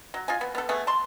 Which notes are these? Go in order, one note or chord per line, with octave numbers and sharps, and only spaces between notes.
F#3
F4 D#5 G#5
B3
B3 A4
A3 B3 G#4 A4
A5 C6